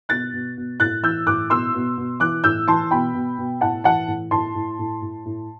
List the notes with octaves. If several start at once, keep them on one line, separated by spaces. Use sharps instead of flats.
B2 F#6 A6
B2
B2
A2 F#6 A6
E3 E6 G6
A2 D6 F#6
B2 C6 E6
B2
B2
E3 D6 F#6
A2 E6 G6
E3 A5 C6
B2 G5 B5
B2
B2
A2 F#5 A5
E3 F#5 A5
A2
A2 A5 C6
A2
A2
A2
A2